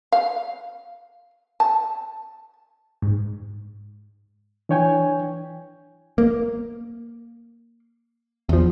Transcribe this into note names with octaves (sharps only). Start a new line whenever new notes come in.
F5
A5
G#2
E3 D4 C#5 G5 G#5
A#3
E2 F3